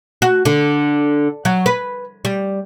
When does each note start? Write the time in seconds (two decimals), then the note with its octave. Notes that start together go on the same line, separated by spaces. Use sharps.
0.22 F#4
0.45 D3
1.45 F#3
1.66 B4
2.25 G3